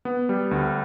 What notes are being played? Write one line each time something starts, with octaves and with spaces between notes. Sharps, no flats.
B3
G3
D2